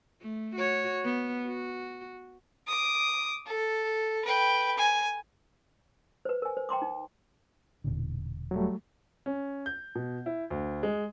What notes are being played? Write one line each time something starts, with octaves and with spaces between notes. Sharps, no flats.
A3
F#4 C#5
B3
F#4
D6 D#6
A4
B4 G5
G#5
B4 C5
A#4 G#5
C5
G5 A#5 C6 D6
D#4
E1 A#2 D3
F#3 G3 A3
C#4
G6
B2
E4
D2
G#3